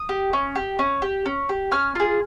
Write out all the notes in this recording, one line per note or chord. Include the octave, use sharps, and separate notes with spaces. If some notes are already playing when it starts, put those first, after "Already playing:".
Already playing: D#6
G4
C#4
G4
C#4
G4
C#4
G4
C#4 F6
F4 G#4